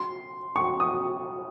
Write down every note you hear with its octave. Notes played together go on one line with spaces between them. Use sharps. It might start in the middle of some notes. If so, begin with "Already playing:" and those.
Already playing: C6
C#6
D#6